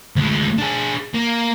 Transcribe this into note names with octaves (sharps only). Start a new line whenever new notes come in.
D2 G#3
D4 G#4
A#3